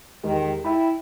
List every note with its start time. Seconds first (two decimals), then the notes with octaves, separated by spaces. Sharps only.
0.24 E2 D#3 G#3 G4
0.65 E4 E5 G5 B5